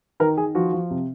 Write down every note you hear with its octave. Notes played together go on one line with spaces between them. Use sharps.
D#3 A#4
D#3 G#4
F3 F#4
F3
C3